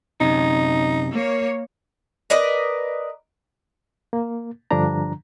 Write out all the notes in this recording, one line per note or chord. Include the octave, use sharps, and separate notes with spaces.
F#2 C3 D#4
A#3 C#5
A#4 B4 D5 D#5
A#3
G2 D3 F3 D4 A#5